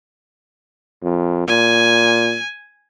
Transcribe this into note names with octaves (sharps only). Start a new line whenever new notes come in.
F2
A#2 G#5